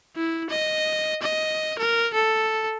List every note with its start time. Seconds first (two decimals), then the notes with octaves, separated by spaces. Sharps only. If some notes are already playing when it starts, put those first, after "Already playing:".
0.16 E4
0.50 D#5
1.22 D#5
1.79 A#4
2.14 A4